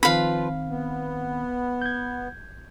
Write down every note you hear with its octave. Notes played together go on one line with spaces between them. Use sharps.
D#3 F3 C4 F4 B4 F5 B5
B3
G6 G#6